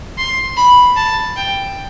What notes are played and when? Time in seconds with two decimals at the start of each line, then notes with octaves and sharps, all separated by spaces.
0.18 C6
0.57 B5
0.97 A5
1.37 G5